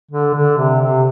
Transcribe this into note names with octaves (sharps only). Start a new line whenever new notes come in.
D3
D3
C3
C3